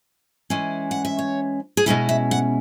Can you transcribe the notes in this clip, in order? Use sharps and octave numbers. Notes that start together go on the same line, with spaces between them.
E3 G#3 C#4 E4
F#5
E5
C#5
G#4
B2 G#3 C#4 E4 B4
E5
F#5